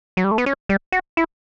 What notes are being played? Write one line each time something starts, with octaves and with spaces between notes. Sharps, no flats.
F#3
G3
A3
B3
C#4
G3
F#4
E4